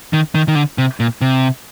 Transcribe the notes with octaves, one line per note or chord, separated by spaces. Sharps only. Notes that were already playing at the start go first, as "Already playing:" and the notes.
D#3
D#3
D#3
D3
C3
A#2
C3